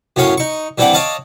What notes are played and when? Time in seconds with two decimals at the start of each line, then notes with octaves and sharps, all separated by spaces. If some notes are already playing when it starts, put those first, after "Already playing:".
0.16 F#2 A2 C#4 C#5 F5 C6
0.38 D#4 C#6
0.78 G2 E3 C4 D4 F#5 D6
0.93 C#5 D#5 F5 A5 D6